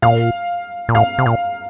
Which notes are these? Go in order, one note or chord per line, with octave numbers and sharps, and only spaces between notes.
A#2 F5
A#2
A2 F5
C3
A#2